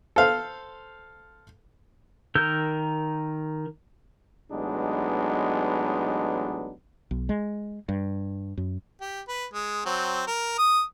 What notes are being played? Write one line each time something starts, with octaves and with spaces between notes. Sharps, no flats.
A4 C5 F5
D#3 A#4 E6 G6
A1 F#3 G#3 B3 D4 D#4
B1
G#3
G2
F#2
G4
B4
G#3
F#3 C4
A#4
D#6